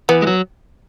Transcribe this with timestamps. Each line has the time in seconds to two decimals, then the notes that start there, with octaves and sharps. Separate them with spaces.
0.09 E3 B3
0.22 G#3
0.27 F#3